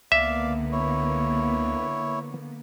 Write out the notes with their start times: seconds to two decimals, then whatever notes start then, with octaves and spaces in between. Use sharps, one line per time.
0.12 C#2 D3 A#3 B3 D5 E5 F5
0.72 E4 C#5